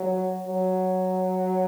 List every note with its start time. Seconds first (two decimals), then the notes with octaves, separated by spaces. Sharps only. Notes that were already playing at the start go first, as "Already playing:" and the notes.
Already playing: F#3
0.49 F#3